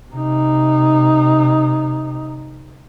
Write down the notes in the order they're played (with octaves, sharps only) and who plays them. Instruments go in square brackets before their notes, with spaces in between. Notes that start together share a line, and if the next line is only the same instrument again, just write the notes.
[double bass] C3 D#4